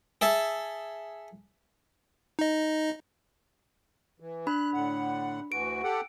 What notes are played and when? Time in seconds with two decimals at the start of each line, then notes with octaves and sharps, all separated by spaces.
0.21 G#4 A4 E5
2.39 D#4 D#5
4.20 E3
4.47 D4 B5 F#6
4.73 A2 D3 F#5
5.52 D2 E3 F#4 D7
5.83 G4 A4 F#5